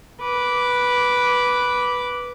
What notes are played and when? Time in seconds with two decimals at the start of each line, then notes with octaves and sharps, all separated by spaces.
0.21 B4 D6